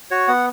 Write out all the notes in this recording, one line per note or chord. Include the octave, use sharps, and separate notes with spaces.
F#4 C#5
B3 F#5